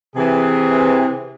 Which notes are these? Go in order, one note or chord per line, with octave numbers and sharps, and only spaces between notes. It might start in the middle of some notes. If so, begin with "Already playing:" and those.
C3 E3 G#4